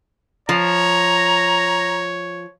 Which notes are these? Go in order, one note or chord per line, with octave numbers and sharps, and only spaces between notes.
F3 C#5 A#5